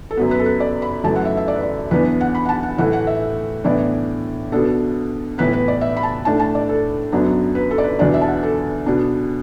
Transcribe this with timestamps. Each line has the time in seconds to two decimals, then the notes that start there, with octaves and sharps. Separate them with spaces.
0.11 A4
0.17 F#2 F#3 B3 B4
0.31 B4
0.39 A4
0.46 B4
0.60 D5
0.82 B5
1.04 F#2 E3 A3 A5
1.16 F#5
1.25 E5
1.37 E5
1.48 D5
1.56 B4
1.63 D5
1.91 E2 E3 B3 D4 B4
2.05 B4
2.21 F#5
2.35 B5
2.45 F#5
2.49 A5
2.63 F#5
2.78 A2 E3 A3 F#5
2.93 F#5
3.07 E5
3.64 A2 E3 B3 D4 D5
4.52 B2 B3 D4 A4
5.38 A2 E3 B3 B4
5.53 B4
5.68 D5
5.81 E5
5.97 B5
6.03 A5
6.25 A2 A3 D4 A5
6.40 A5
6.55 D5
6.69 A4
7.12 F#2 F#3 B3 D4
7.55 B4
7.71 A4
7.78 D5
7.84 B4
7.99 E2 B2 B3 D4 D5
8.14 E5
8.21 A5
8.28 F#5
8.43 A4
8.86 B2 B3 D4